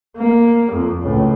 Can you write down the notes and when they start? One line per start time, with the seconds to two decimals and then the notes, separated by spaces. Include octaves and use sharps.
0.17 A#3
0.72 F2
1.02 C#2 A2